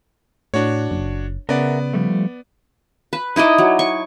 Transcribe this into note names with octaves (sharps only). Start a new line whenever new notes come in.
A2 D4 F#4 C#5
F#1
C#3 B3 A#4 D5 E5 F#5
F3 G3 A3
B4
D#4 E4 D5 D#5
F#3
C#6